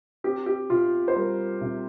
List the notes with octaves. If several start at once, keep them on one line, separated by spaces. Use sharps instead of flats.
C4 G4
G4
C3 F4
C5
G3 A#4
C3